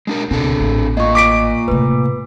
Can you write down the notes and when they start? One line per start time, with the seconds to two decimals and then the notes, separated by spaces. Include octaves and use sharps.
0.07 G#3 D4 A#4
0.31 C#2 B2 C4 D4 A4
0.60 A1
0.97 A#3 F4 D#5 C#6
1.15 D6 B6 D7
1.68 A2 C3 B4